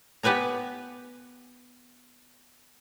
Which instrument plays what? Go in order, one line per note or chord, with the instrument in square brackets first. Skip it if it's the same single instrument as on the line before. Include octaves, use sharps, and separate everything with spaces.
[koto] B3 G4 B4 G#5 A#5